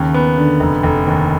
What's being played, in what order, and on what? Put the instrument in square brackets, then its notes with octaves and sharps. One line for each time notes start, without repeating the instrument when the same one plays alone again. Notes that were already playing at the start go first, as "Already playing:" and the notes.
Already playing: [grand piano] D#2 C#3
B3
D3
F1
F1
D#2